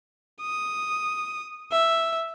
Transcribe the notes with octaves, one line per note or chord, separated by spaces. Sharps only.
D#6
E5